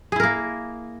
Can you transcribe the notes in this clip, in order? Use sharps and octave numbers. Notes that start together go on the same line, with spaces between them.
A#3 E4 G#4 A#4